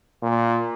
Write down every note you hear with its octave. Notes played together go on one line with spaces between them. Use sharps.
A#2